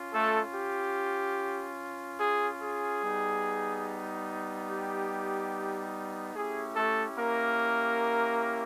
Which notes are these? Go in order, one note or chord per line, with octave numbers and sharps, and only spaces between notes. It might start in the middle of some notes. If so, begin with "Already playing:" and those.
Already playing: C#4 F4
A3 A4
G4
G#4
G#4
G3 B3 D#4
G4
A3 C#4 E4 G4 G#4
A3 A4
A#3 A#4